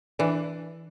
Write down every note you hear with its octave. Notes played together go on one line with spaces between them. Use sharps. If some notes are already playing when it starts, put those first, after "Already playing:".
E3 D4